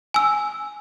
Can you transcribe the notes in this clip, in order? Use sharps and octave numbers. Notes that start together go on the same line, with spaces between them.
G#5 E6